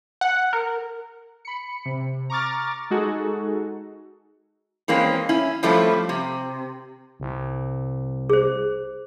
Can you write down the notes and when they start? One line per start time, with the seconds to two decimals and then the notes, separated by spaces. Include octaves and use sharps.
0.21 F#5
0.53 A#4
1.45 B5 C#7
1.85 C3
2.30 A#5 C#6 D6 F6 A6
2.90 G#3 D#4 F#4 G#4 A4
4.88 E3 G#3 A#3 C4 C#4
5.29 C#4 E4
5.63 F2 F3 G3 A3 C#4 E4
6.09 C3
7.20 C2
8.30 G#4 C5